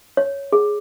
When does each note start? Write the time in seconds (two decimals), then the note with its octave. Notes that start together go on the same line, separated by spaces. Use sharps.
0.17 C#5
0.52 G#4